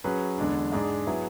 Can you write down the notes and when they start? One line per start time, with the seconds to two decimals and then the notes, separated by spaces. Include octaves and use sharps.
0.04 F#3 C#4 G#4 B4
0.38 E2 D3 G#3 D4
0.72 G#2 G#3 D4 G#4
1.07 F#3 B3 E4 G#4